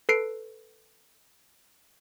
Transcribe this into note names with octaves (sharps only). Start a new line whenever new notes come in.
A4 B4 C7 D7